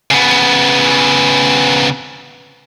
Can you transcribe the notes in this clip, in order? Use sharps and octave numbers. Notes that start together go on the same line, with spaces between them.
C#3 B3